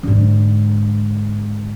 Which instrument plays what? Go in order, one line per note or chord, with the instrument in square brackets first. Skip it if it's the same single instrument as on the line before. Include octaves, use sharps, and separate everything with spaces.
[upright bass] G#2 D3